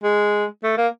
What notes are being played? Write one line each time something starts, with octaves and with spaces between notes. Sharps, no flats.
G#3
A3
A#3